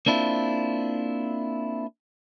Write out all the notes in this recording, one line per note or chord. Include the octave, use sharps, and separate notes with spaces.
A#3 C4 D4 E4 F4